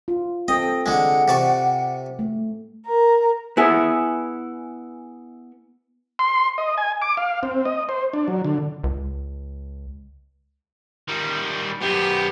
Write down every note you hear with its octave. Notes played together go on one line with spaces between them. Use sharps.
F4
C4 A4 D#5 G5
D3 G#3 F#5
C3 D5 C#6
A3
A#4
B3 E4 G#4
C6
D#5
G#5
D6
F5
C4
D#5
C5
D4
F#3
D3
C#2
D#3 G3
F#2 B3 G4